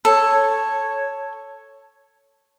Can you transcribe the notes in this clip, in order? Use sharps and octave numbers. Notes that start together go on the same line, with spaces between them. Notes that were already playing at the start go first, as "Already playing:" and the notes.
A4 C#5